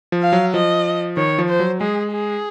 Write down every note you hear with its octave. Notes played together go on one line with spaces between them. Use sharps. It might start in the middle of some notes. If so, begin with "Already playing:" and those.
F3
F5
F#3
F3 D#5
D#3 C#5
F3
C5
F#3
G#3 G#4
G#4